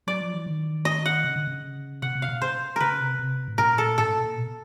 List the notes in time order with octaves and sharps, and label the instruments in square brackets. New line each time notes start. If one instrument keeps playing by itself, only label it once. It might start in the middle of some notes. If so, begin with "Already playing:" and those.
[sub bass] F#3 [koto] D5
[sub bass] F3
E3
D#3
[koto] D#5
F#5
[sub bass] C#3
D3
C#3
[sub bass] C3 [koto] F#5
[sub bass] C3
[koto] F5
[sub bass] B2
[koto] C5
[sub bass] C#3 [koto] A#4 B4
[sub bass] C3
C3
A2
[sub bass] A#2 [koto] A#4
[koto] A4
[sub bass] A2 [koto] A4
[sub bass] A#2
A#2
B2